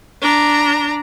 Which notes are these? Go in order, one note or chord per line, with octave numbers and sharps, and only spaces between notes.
D4 A#5